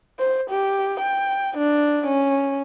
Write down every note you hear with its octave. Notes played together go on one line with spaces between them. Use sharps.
C5
G4
G5
D4
C#4